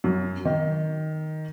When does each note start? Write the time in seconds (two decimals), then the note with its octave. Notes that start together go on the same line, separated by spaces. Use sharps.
0.04 F#2
0.45 D#3